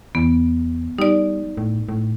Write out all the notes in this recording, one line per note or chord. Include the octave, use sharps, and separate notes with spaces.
E2 B3
G3 D#4 D5
A2
A2